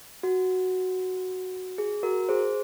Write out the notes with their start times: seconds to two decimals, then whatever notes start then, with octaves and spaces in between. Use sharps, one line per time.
0.23 F#4
1.78 G#4
2.03 F#4 A#4
2.29 G#4 C5